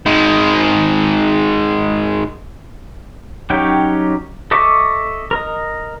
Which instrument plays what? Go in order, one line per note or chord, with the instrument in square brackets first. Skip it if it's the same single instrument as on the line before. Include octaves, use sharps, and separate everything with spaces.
[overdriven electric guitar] D#3 G#3
[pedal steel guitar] F#3 C#4 D#4 G4 G5
A4 D#5 E5 C#6 D6
A#4 D#5